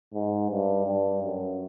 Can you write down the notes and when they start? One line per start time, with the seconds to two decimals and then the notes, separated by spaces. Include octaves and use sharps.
0.14 G#2
0.51 G2
0.86 G2
1.22 F#2